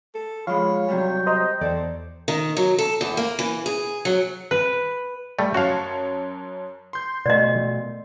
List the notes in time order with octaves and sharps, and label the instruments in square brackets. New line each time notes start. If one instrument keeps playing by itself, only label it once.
[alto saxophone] A4
[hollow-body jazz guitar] F3 G#3 [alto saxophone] C#5 [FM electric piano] F5 [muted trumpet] B5
[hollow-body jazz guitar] C3 F#3 G3 [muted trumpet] G5
[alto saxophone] G4 [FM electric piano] C5 D#5 A#5
[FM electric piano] E2 [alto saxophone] A4 [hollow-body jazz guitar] C5 D5
[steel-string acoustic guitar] D#3
F#3
A4
E2
A#3
E3
G#4
F#3
[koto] B4
[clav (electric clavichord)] G3 A3
[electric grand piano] F#2 C#5 A5 [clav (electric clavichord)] F#4 F5
[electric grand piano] C6 G6
[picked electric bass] B2 A3 [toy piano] D5 D#5